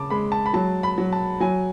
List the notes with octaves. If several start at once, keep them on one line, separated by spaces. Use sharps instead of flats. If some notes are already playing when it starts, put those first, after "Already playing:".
Already playing: C#3 A5 D6
G#3 B5
A5
B5
F#3 A5
B5
F#3
A5
F#3 G#5